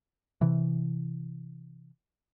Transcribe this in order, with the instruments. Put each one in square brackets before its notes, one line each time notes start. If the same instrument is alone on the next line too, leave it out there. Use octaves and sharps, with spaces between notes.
[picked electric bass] C3 E3